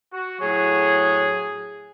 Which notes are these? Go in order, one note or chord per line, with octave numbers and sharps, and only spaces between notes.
F#4
A2 F#3 G#4